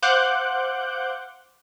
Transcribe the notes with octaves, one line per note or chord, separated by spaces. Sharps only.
C5 F5 F#5 D6 F#6 G6